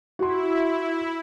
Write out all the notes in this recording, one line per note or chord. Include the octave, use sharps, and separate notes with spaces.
E4 F#4 C6